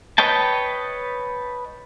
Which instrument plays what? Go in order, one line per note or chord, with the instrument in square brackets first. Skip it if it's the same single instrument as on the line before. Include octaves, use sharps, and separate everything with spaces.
[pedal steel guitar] B4 C#5 D#5 G5 A5